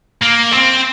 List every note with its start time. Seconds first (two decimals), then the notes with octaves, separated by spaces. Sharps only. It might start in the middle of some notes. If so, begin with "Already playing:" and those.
0.23 A#3
0.52 C4